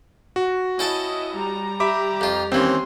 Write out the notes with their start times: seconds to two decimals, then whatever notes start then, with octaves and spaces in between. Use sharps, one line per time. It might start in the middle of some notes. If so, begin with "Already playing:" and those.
0.36 F#4
0.79 C#4 E4 D#5 G5 A5
1.37 G3 A#5
1.80 G4 E5 B5 D6
2.21 F2 F4
2.52 D#2 E3 C4 C#4 C6